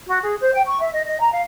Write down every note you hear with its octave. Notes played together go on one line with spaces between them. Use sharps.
F#4
G#4
C5
G5
C#6
E5
D#5
D#5
A#5
F5